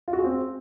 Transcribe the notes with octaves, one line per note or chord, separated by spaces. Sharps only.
F4
F#4
G#4
C4